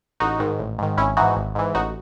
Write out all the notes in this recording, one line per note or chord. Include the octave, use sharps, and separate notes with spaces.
A1 D#4 F#4
G#2 D#3
A1
G#2 D#3
G#1 C#4 E4
G#2 E3 D#4 F#4
G#1
G#2 E3
A1 D#4 F#4